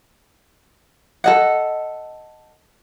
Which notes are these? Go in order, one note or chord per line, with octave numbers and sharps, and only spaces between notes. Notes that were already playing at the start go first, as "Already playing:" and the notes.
A4 D#5 F#5